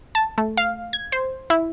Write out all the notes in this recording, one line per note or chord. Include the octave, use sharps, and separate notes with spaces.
A5
A3
F5
G#6
C5
E4